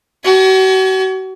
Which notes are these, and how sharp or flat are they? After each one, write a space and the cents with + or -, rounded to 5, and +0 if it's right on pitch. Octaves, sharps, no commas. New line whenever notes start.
F#4 +40 G#5 +35